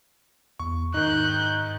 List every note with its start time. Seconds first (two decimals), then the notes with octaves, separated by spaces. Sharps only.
0.60 E2 C#6
0.94 G#2 D#3 D#4 F#6 G6